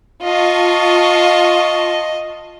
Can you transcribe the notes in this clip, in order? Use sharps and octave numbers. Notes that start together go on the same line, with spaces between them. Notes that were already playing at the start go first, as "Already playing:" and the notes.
F4 D#5 A5 C#6